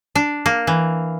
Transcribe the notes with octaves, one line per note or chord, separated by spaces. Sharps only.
D4
A#3
E3